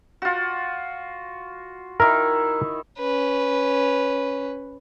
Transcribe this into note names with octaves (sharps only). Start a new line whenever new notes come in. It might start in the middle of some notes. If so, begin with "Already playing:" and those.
F4 F#4
D#3 E4 A#4
C#4 B4